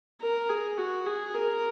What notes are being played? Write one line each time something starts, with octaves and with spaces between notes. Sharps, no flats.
A#4
G#4
F#4
G#4
A#4